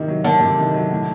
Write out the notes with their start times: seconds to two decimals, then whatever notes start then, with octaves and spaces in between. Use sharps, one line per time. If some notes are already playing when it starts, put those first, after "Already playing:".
Already playing: C3 D#3 A#3
0.08 F#3
0.24 D3 A#3
0.41 C3
0.58 D#3
0.74 F#3
0.91 A2